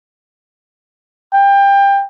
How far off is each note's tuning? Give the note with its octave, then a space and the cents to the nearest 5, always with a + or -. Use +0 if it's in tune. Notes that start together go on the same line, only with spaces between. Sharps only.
G5 +25